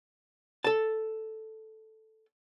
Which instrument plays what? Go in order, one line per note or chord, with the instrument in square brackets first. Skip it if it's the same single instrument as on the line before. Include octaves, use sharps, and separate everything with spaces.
[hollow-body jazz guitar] A4 A5